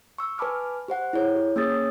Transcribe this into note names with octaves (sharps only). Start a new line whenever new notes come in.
C#6 E6
B4 G#5 A5 B5 D6 F6
G4 C5 F#5
E4 G#4 C#5
G4
A#3 C#4 G#4 C#5 D#6 A6